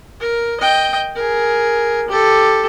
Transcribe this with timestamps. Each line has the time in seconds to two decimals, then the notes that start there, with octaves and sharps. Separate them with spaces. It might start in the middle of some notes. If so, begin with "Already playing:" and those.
0.20 A#4
0.60 D#5 G5
1.16 G#4 A#4
2.08 G4 A4